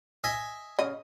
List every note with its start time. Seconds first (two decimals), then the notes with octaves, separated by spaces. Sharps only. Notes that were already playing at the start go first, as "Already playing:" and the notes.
0.24 D#5 E5 G#5
0.79 C#3 D#5